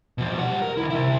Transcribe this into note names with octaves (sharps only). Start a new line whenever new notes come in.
B2 F3
G3 F#5
A#4
D3 E4
C3 E4